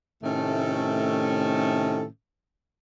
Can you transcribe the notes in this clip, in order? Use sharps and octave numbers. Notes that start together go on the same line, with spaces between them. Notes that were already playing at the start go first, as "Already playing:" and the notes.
A2 C3 D#3 A3 C#4 A4